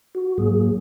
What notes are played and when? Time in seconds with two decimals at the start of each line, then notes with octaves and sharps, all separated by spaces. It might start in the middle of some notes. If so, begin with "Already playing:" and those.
0.15 F#4
0.38 G#2 F#3 A#3 G#4